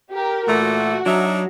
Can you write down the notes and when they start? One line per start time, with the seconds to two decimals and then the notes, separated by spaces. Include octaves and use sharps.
0.11 G4 A#4
0.48 A#2 E3 A3 F#4
1.06 F#3 D4 D#4 E5